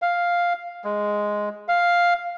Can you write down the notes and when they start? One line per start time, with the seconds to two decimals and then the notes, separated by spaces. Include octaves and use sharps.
0.02 F5
0.84 G#3
1.68 F5